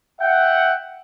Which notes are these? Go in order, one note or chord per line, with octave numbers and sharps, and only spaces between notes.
E5 F#5 G5